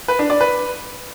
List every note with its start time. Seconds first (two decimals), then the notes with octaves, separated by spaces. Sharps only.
0.08 B4
0.19 D4
0.30 D5
0.41 B4